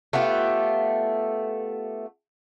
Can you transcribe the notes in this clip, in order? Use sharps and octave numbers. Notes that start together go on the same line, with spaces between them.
A3 B3 F4 G4